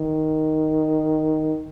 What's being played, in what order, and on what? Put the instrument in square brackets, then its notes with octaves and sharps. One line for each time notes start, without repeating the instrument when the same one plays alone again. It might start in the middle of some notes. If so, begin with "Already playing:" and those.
Already playing: [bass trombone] D#3